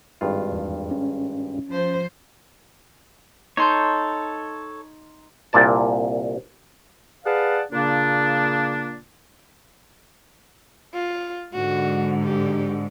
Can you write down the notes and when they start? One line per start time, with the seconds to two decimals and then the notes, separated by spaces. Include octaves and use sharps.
0.21 G#1 G2 F4
0.52 E2
0.91 C#4
1.68 F3 C5
3.57 D#4 A4 C#5 C6 G6
5.53 C2 A#2 D5 A5
7.25 G#4 B4 D5 F5 F#5 A5
7.71 A#2 C#3 A#3 D4
10.94 F4
11.53 G#2 D3 F#4
12.24 G4